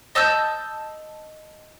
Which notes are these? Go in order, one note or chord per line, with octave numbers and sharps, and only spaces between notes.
D#5 A5 E6 G6